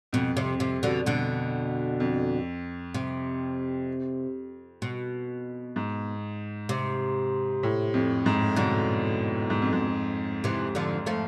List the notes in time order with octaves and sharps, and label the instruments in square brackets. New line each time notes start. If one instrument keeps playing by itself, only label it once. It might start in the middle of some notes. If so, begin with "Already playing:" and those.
[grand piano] F2 [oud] B2
[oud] C3
C3
B2 D3
B2 D3
[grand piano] F2
[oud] C3
B2
[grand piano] G#2
[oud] C3
[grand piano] A2
F2
G#2
[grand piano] G#2 [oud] B2 D3
[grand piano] G#2
F2
G#2
[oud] C3 E3
D3 F3
F3 A3